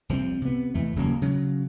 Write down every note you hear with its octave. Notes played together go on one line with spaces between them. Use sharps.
C2 F3 F#3 C4
C3 B3
F2 E3 A3
D#1 C#3 F#3 A#3
C#3 F#3